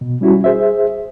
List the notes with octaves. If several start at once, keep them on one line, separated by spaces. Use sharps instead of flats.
B2
G3 C#4 E4 F#4
G#4 C5 E5